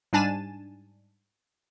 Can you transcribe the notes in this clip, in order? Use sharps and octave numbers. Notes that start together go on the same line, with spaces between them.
G#2 G3 D4 G#5 A6 E7